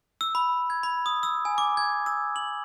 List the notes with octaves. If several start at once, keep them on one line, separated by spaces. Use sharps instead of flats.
E6
B5
G#6
B5
D#6
E6
G#5
D6
G#6
E6
F#7